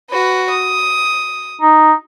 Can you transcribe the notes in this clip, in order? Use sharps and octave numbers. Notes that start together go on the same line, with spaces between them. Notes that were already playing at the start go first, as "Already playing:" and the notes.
F#4 B4
D#6
D#4